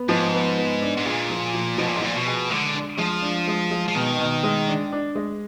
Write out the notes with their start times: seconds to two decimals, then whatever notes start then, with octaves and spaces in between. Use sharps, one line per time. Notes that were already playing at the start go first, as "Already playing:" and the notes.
Already playing: B3
0.09 G#2 F3
0.34 B3
0.58 B3
0.82 D4
0.97 G#2
1.05 A#2 G#4
1.30 F3
1.54 F3
1.78 B2 F3
1.87 A#2
1.96 G#2
2.02 A#2 F3
2.15 B2
2.27 G#4
2.51 D3 G#3
2.74 D4
2.98 F3 G#3
3.22 D4
3.48 G#3
3.71 G#3
3.88 F3
3.95 B2 D#3
4.19 B2
4.43 G#3
4.68 D4
4.92 D4
5.15 G#3